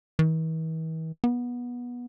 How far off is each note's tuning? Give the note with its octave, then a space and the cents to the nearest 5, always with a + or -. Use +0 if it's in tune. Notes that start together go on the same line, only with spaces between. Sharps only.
E3 -45
B3 -20